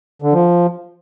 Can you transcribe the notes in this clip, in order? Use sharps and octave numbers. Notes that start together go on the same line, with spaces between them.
D3
F3